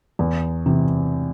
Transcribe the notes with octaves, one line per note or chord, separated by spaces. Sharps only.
E2
C3 E3